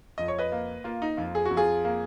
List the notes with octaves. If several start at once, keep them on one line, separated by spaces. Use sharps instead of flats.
F2 D#5
C#5
B4 D#5
A#3
A#3 F4
D#4
F2 F4
G#4
F#4
F2
F4 G#4
A#3